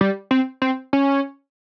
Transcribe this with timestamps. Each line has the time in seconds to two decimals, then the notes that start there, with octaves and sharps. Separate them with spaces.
0.01 G3
0.31 C4
0.62 C4
0.93 C#4